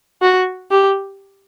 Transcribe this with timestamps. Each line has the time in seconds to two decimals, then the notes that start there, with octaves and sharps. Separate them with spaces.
0.22 F#4
0.71 G4